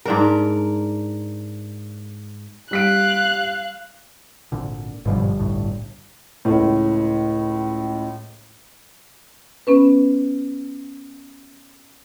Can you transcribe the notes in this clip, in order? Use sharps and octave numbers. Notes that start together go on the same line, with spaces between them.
G#2 D4 A#4
G3 F5 F#6 B6 D7
G#1 A#2 D3
G1 G#2 B2 D3 F3 G3
B1 A2
C#2 A2
B3 C#4 B4